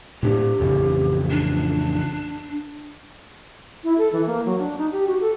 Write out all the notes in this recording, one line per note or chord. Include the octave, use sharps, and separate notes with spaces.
A2 D4 G4
A1 F2 C#3
D4
E4
A4
E3
A#3
F#3
D4
D#4
G4
F#4
A4